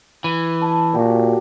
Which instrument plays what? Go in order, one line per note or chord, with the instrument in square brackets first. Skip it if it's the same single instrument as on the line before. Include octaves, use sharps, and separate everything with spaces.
[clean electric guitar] E3
[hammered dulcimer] A5
[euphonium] A#2 [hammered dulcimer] F#4 G4